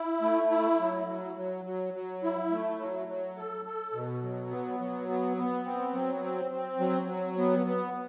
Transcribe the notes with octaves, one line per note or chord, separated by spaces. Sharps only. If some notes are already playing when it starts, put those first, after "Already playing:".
Already playing: E4
A3
E4
F#3
F#3
F#3
F#3
F#3
E4
A3
F#3
F#3
A4
A4
B2
F#3
B3
F#3
B3
B3
C4
F#3
C4
C4
F#3
F#3
B3
B3